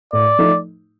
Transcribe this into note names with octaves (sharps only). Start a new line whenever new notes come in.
A2 D5
F3 A3 D#4